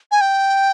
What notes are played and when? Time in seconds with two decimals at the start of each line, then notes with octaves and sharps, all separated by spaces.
0.11 G#5
0.21 G5